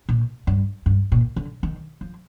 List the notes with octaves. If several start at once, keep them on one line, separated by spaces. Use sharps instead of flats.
A#2
G2
G2
A#2
D3
D#3
F3